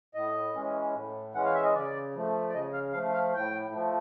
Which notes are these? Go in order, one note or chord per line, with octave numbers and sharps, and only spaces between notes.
A2 D#5
E3 G#3 C#4
A2
E3 G#3 C#4 F#5
F5
E5
D#5
C#3 D5
F3 A3
D5
C#3 D#5
F5
F3 A3 F5
F5
A2 G5
F3 A3